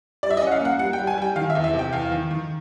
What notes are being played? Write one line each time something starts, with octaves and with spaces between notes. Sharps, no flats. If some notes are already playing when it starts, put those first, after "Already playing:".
G3 D5
E5
D#5
C#4 F#5
F5
A#3 F#5
G3 F#5
G5
G3
G#5
G3 G5
D#3 F5
E5
E2
E5
C3
G5
E2 F5
D#3
D#3